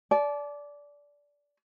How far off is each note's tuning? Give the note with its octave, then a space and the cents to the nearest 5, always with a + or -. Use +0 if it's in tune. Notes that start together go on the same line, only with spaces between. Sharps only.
D5 -15 A5 -40